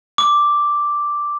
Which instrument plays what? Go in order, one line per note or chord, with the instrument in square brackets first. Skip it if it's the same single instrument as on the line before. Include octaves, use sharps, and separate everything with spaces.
[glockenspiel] D6